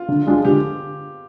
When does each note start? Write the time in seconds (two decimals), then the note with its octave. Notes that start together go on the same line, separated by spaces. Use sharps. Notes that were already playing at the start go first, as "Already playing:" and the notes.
Already playing: F4
0.08 D3
0.27 G#3 D4 F4
0.45 D3 G4